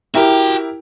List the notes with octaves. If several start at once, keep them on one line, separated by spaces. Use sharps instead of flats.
E4 F#4 G4 A#4 G5